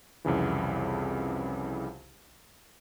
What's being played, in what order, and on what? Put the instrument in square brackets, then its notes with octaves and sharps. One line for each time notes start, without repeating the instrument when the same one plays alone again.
[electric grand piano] C2 F2 C#3 E3